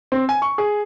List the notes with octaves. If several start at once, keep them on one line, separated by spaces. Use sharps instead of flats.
C4
G#5
C#6
G#4